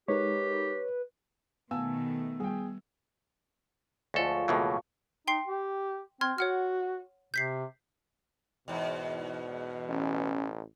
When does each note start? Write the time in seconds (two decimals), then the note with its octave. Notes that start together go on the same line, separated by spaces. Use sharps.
0.08 G#3 D#4 G4 A#4 B4 C#5
1.71 B2 D#3 A3 B3 F5 G#5 A5 E6
2.40 G3 G#4 G5
4.14 D2 F3 G#3 A4 C#5
4.48 C#2 B2 E3 A3 A#3 F#4
5.28 D#4 G5 C6 C7
5.46 G4
6.21 C4 C6 F6 G#6
6.38 F#4 C#5 F#5 F6
7.34 C3 G6 B6 C7
8.68 E2 G#2 B2
9.89 A1 C#4